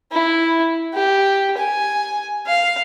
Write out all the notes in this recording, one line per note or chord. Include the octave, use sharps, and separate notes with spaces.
E4
G4
G#5
F5